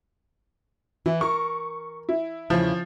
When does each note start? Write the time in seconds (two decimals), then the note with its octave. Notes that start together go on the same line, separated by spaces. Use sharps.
1.06 E3 E4
1.21 A#4 C#6
2.09 E4
2.50 E2 C#3 F3 E4